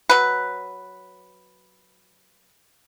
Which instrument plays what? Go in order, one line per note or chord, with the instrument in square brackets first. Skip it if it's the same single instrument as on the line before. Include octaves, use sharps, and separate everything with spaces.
[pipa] F#3 B4